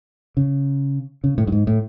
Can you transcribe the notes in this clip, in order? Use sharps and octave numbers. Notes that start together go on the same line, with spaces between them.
C#3
C#3
A2
G2
G#2
A2